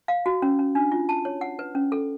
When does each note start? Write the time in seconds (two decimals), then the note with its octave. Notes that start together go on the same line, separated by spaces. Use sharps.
0.08 F5
0.26 F#4
0.42 C#4
0.59 C#4
0.75 D4
0.92 F4
1.09 A5
1.25 C#5
1.41 F#5
1.59 B4
1.75 C#4
1.92 A4